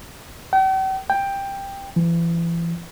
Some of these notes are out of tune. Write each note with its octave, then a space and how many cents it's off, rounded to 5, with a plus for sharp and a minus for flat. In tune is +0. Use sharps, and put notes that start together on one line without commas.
G5 -45
G5 +10
E3 +35